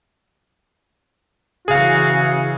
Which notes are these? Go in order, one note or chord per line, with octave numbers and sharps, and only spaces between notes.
C#3 E3 F#4 G#4 F5